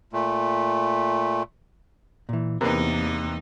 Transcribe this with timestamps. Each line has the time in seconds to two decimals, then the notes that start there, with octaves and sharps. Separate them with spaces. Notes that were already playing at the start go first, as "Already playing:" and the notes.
0.13 A#2 A3
2.29 A#2 E3
2.61 E2 C3 A#3 D#4 A#4 B4